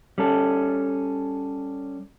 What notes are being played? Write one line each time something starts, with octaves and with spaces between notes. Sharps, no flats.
G3 C#4 A4